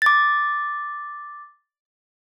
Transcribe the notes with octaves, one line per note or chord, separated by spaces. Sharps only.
D6 A6